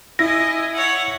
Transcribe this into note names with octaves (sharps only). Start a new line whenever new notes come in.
E4 D#5 G#5 A#6
C#5 F#5